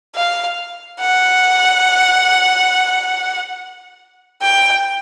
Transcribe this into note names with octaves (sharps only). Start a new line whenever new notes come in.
F5
F#5
G5